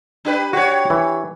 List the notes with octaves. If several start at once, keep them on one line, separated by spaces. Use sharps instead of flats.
D4 G4 B4
F#4 G4 C#5
E3